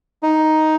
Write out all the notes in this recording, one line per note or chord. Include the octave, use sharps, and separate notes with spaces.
D#4